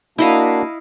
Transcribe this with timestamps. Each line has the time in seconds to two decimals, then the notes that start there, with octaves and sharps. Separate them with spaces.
0.18 A#3 D4 E4 F#4 D#5 F5